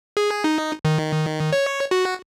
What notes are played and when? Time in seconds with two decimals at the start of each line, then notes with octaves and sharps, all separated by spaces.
0.17 G#4
0.44 D#4
0.85 D#3
1.53 C#5
1.91 F#4